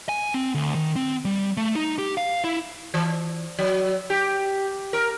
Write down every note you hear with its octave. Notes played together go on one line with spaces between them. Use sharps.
G#5
C4
D2
D#3
C4
G3
A3
D#4
G4
F5
E4
E3
F#3
G4
A#4